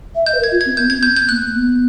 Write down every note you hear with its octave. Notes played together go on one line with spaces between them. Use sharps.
E5
D#5 G6
B4
A#4
G#6
F4
C4 G#6
B3 G6
C4 G#6
B3 G6
G6
A#3 F#6
A#3
B3